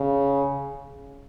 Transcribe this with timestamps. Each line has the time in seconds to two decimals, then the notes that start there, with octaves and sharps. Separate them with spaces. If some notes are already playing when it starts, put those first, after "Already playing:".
Already playing: C#3